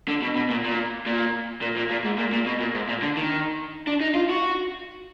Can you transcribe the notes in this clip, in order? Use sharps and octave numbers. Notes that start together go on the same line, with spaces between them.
D3
B2
B2
A#2
A#2
A#2
A#2
A#2
A#2
G#2
A#2
A#2
B2
A#2
G#2
A#2
D3
D#3
D4
D#4
F4
F#4